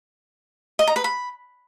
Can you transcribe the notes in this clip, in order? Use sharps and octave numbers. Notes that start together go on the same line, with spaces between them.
D#5
A#5
B4
B5